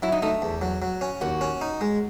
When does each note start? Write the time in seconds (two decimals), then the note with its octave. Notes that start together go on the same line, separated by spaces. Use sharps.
0.02 F#3 E4
0.12 D#4
0.22 A3 D#4
0.42 E2
0.61 F#3
0.82 F#3
1.01 C#4
1.21 D#2 F#4
1.41 C#4
1.61 D#4
1.81 G#3